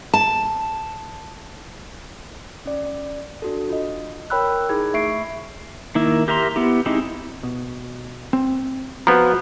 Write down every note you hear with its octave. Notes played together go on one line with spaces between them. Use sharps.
A5
C#4 D5
D4 F#4 A4
F4 D#5
A#4 C#5 G5 B5 E6 F#6
D#4 E4 G#4 B5 G#6
A3 E5 C#6 C7 D7
D#3 A#3 E4
G4 A#4 E5 A#5 C6
B3 E4 G4
G#3 C4 D#4 E4 G4
B2
C4
F3 B3 F#4 A#5